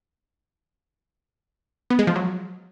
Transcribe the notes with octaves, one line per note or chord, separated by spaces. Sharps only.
B3
G#3
F3
F#3